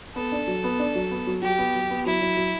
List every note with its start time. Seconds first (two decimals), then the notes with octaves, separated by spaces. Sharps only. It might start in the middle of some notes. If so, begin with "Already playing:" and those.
0.16 B3 A4
0.32 D4
0.48 F#3
0.64 B3
0.79 D4
0.95 F#3
1.11 B3
1.27 F#3
1.42 F#3 G4
1.58 B3
1.75 F#3
1.90 B3
2.06 F#3 E4
2.22 F#3
2.37 F#3